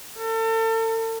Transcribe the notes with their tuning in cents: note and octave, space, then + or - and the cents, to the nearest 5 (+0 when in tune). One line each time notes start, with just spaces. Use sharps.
A4 +40